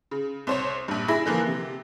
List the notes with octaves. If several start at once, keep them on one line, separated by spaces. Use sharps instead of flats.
C#3
C2 C5 C#5
A#1 G2
E4 G#4 B5 A#6
D3 E3 F3 A#3
C3